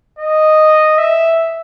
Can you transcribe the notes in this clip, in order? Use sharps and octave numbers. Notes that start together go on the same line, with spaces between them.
D#5
E5